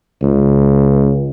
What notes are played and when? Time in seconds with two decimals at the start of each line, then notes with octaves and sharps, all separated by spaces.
0.23 C#2